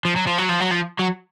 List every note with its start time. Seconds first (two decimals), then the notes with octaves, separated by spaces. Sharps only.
0.05 F3
0.16 F#3
0.27 F3
0.38 F#3
0.49 F3
0.60 F#3
0.71 F3
0.99 F#3